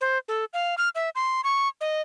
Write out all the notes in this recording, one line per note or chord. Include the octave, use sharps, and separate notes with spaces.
C5
A4
F5
F6
E5
C6
C#6
D#5